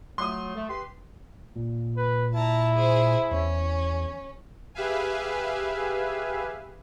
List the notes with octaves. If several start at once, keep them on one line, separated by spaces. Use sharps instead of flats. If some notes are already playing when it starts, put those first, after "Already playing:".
F#3 A3 C6 D#6
A3
G4 B4 C6
A#2
B4
E4 A5 A#5
G#4 C5
E2 C#4
G4 G#4 B4 E5 F5 G#5